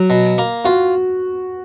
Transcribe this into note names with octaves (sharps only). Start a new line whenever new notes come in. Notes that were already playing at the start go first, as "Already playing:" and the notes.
Already playing: F#3
B2
A#3
F4 F#4